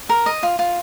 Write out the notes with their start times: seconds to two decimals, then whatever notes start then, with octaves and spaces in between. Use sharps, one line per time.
0.09 A#4
0.26 D#5
0.43 F4
0.59 F4